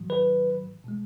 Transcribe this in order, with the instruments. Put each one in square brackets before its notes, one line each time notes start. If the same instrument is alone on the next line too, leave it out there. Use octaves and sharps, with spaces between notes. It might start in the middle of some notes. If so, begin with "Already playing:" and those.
Already playing: [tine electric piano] G#2 D#3 F#3
B4
B2 G#3